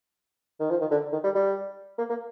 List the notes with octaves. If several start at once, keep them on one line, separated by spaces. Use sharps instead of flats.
D#3
F3
D#3
D3
D#3
G3
G3
A#3
A#3